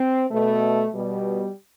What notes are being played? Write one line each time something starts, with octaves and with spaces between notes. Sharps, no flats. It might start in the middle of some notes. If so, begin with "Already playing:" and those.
Already playing: C4
B2 A3
B2 G3